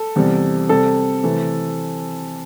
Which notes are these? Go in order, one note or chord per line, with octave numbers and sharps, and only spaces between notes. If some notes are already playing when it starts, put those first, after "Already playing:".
Already playing: A4
E2 C3 G3
C3 G3 A4
C3 E3 A3